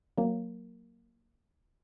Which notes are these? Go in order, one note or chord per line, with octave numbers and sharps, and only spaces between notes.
F#3 A#3